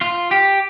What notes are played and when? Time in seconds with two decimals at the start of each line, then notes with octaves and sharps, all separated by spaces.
0.01 F4
0.31 G4